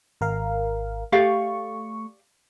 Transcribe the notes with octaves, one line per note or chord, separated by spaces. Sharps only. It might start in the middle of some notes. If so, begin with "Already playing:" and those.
G#1 A#4 F5
A3 G4 D5 F5 C#6